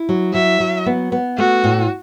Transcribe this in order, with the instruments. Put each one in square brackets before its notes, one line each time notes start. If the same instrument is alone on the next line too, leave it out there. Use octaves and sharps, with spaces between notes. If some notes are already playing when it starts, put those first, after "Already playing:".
Already playing: [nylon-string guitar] E4
F#3
[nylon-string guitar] F#3 [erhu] E5
[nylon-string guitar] F#3
B3
B3
[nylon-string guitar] A3 [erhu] F#4
[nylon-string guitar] A2